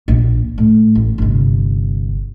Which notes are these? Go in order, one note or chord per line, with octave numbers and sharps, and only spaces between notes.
A#1
A2 A3
A1
G1 C3